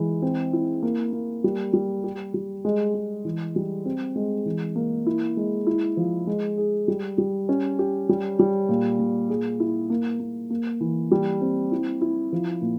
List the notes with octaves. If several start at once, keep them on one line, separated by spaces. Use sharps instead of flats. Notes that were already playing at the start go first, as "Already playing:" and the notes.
Already playing: E3 G#3
C4
E4
A#3
A#3
G3
G3
G4
G3
G#3
G#3
E3
G3
C4
G#3
E3
A#3
E4
G#3
E4
F3
G#3
G#4
G3
G3
C#4
G4
G3
G3
A#2
A#2
G#4
E4
A#3
A#3
A#3
E3
G3
C4
E4
E4
F3
A#2